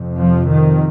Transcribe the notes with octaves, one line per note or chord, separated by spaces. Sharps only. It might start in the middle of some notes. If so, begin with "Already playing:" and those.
Already playing: F2 C3
F3
D#3